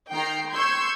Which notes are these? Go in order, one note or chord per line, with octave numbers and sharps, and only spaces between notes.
D#3 G5 A#5 C7
C6 C#6 E6 G6 G#6